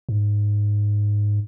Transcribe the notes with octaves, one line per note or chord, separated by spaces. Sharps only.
G#2